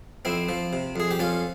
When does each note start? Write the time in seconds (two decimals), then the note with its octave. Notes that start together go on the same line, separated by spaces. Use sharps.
0.25 F2 C4 E4
0.49 F3
0.73 C3
0.96 F2 G#4
1.11 G4
1.19 F2 C#4 F4